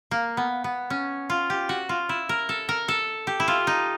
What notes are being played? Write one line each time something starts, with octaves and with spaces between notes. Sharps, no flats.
A#3
B3
B3
C#4
F4
G4
F#4
F4
E4
A#4
A4
A#4
A4
G4
E4
F4
D#4